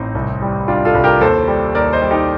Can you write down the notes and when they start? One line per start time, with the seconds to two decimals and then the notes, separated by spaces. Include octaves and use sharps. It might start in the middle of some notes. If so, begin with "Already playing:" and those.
Already playing: A1 C4 D#4
0.15 C2
0.42 G3
0.68 G3 D4 F4
0.85 F4 A4
0.94 C2
1.04 G4 A#4
1.21 D#2 A4 C5
1.48 G3
1.75 D#2 A#4 D5
1.93 C5 D#5
2.02 G3
2.11 D#4 G4